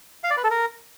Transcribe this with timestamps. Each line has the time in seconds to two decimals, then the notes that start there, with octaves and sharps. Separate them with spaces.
0.24 F5
0.30 D5
0.37 B4
0.44 A4
0.51 A#4